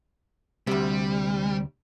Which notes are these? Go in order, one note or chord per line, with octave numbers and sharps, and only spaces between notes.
D2 C3 G3